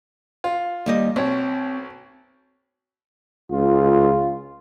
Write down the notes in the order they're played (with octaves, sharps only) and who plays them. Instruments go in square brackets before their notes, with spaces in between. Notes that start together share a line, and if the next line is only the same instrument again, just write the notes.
[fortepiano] F4
[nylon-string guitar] D#2 G3 D#5
[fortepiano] B1 C#5 [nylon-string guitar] C4
[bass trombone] C#2 [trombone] F4